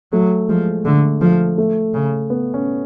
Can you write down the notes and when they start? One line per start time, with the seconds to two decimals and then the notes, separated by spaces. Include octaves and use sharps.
0.12 F#3 A3
0.49 F3 G#3
0.85 D3 A3
1.21 F3 A3
1.58 A3
1.94 C#3
2.30 B3
2.54 C#4